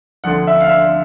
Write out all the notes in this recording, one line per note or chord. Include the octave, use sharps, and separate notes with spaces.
D2 D3 F3 F#5
E5
F5
E5